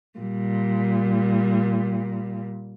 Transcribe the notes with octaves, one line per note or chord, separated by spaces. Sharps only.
A#2 G3